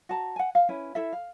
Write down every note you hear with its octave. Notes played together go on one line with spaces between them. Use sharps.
F#4 A5 A#5
F#5 G#5
F5
C#4 E4 B4
E4 A4 E5
F5